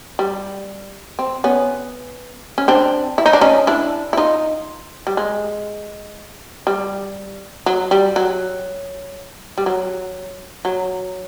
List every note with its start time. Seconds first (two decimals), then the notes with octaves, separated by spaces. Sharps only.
0.19 G3
1.19 C4
1.44 B3 C#4
2.58 C#4
2.68 C4 D4
3.18 E4
3.26 D#4
3.33 D4
3.41 C#4 D#4
3.67 D4 E4
4.13 E4
4.17 D#4 F4
5.07 G3
5.17 G#3
6.67 G3
7.66 F#3
7.91 G3
8.16 F#3
9.58 G3
9.66 F#3
10.65 F#3